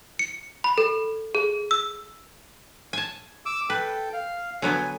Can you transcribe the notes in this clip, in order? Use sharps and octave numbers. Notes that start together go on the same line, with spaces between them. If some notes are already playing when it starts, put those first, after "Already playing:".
C#7
B5
A4
G#4
E6
G#5 A5
D6 E6
A4 B4 G5
F5
D3 F#3 B3 G#5